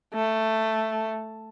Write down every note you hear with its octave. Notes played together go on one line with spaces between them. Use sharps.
A3